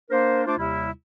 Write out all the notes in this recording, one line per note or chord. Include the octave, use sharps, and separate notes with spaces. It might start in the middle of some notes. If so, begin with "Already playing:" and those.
A#3 D4 A#4 C5
A3 D4 F4 C5 D6
D#2 C3 G3 E4